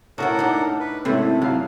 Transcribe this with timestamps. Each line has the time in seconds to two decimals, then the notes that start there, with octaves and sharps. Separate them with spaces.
0.18 A2 C#4 D4 F#4 A4 A#4 F#5
0.39 D4 D#4
0.80 B4
1.05 G#2 C3 A3 C#4 E4 A4
1.42 F#2 F#3 F5